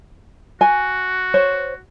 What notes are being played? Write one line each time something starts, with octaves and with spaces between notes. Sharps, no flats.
F#4 G#5
C5 C#5